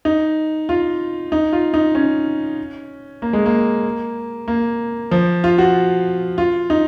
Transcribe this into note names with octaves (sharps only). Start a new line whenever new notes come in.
D#4
F4
D#4
F4
D#4
C#4
A#3
G#3
A#3
A#3
F3
F4
F#4
F4
D#4